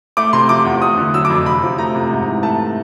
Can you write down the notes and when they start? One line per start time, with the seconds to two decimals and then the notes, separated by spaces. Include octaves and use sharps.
0.17 A3 D6
0.33 C3 C6
0.49 F3 D6
0.65 E2
0.82 A3 D#6
0.97 D3
1.14 F#3 E6
1.25 D6
1.30 F2
1.46 C3 B5
1.62 F3
1.78 A3 A#5
1.95 C3
2.11 G#2
2.27 E3
2.43 A3 A5